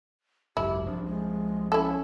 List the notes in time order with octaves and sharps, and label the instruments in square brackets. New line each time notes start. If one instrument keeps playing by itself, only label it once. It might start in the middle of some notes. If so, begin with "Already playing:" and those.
[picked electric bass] G#1 C#2 F#2 [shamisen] E4 [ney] G4
[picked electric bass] C2 F3 [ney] D4
[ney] G#3
[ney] C#4 [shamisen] E4 A4